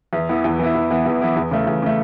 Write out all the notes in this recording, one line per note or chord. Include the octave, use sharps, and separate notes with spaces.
E2
E3 B3 E4
E2
E3 B3 E4
E2
E3 B3 E4
E2
E3 B3 E4
E2
C#3 A3
E2
C#3 A3